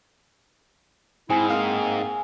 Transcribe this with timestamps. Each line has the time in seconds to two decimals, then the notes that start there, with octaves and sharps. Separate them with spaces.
1.30 G#2 C4 E4 G#4
1.50 A#3 C4 F5 D#6